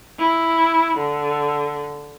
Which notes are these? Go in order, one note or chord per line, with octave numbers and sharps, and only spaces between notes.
E4
D3